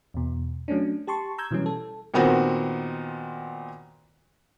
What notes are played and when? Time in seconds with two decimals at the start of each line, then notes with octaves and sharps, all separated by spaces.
0.14 E2 B2
0.68 F#3 A3 C#4 D4
1.07 G4 A5 C6 C#6
1.38 A#5 E6 G6 G#6
1.51 B2 E3 F#3 G3 C#4
1.66 A4
2.14 A#2 D#3 B3 C4 F#4